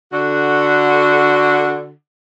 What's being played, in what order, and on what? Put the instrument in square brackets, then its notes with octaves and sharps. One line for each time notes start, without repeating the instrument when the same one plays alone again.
[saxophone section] D3 F#4